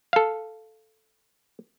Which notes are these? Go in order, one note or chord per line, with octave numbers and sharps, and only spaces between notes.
A4 F5